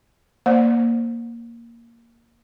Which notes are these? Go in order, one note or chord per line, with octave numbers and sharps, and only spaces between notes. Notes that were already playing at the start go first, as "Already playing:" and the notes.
A#3 C5 D5